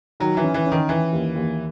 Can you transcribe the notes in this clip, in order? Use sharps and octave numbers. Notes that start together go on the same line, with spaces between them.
D#3 F#3
E3
C#4
E3
C#4
D#3
E3 C#4
D#2
D#2